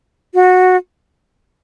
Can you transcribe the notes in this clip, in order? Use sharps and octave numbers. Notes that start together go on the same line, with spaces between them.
F#4